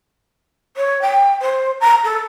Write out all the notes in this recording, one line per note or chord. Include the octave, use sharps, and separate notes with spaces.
C#5
G5
C5
A#5
A4